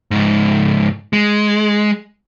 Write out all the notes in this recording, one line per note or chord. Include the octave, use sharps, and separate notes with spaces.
C#2 G#2
G#3